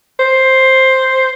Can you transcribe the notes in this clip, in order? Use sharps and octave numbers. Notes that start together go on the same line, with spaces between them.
C5